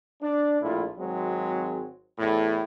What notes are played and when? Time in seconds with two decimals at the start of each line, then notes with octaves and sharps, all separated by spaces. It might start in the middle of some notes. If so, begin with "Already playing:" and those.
0.21 D4
0.62 A#1 A2 E4 F4
0.98 G#1 F#3 G#3 C4
2.18 E2 A2